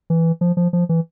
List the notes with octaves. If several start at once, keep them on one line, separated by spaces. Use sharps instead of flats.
E3
F3
F3
F3
E3